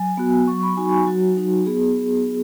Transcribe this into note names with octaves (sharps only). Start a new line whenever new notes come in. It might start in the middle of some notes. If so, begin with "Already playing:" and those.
Already playing: F#3 G#5
B3 F#4
F#3 C#6
B5
D#4 F#4 G#5
G#5
F#3 F#4
D#4 F#4
B3 G#4